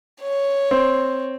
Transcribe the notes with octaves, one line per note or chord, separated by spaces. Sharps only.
C#5
C4